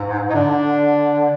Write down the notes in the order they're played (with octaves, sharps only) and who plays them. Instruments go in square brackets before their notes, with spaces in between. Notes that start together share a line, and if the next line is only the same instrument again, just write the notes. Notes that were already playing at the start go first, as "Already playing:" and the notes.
Already playing: [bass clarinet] G#2
[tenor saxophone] D#4
[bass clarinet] D3 [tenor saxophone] D4